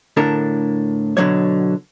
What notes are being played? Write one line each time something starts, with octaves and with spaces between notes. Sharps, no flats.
A2 D3 D4 A4 A#4
B2 D3 E3 F#3 C#5